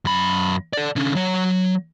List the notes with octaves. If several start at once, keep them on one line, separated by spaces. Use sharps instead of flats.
F#2 B5
A4 D5
D3 C#4
F#3 C#5